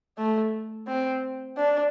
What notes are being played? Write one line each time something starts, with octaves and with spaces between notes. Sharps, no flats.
A3
C4
D4